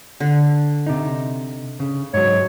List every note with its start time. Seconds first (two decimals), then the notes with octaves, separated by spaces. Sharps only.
0.20 D3
0.86 C3 D#4
1.80 C#3
2.14 G#2 F#3 C#5